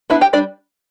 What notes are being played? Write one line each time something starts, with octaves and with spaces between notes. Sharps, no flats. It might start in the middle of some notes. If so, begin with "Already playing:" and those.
B3 D4 E4 E5
G4 G5
G3 D4 D5